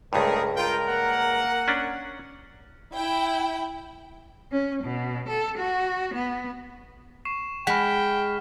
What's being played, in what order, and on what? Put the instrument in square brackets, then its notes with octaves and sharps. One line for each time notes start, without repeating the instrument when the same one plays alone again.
[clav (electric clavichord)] C#2 G2 [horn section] A3 G#4 [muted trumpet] A#4
[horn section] F4 G5 [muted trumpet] A#4
[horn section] A#3 F#5
[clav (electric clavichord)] C#4 D4
[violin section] E4 G5
[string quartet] C#4
B2
A4
F#4
B3
[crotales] C#6 C7 E7
[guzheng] G#3 [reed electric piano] F#5 B5 [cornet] G5 [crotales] F6 B6